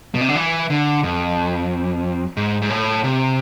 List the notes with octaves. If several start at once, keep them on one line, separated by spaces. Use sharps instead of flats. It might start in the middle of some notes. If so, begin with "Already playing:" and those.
B2
C3
D3
E3
D3
F2
G#2
G#2
A2
C3